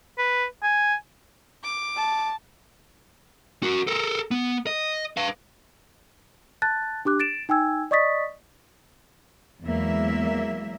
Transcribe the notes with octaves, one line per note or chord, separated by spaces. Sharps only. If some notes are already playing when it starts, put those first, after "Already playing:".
B4
G#5
D6
A5
F#4 A#4
A4 A#4
B3
D#5
B4 F5
A5 F#6 A6
D4 G4 D6 F#6
A6 D7 E7
D#4 G5 G#5 E6 G#6
D5 D#5 C#6 D#6 A6 B6
E2 F#3 G#3 A#3 E5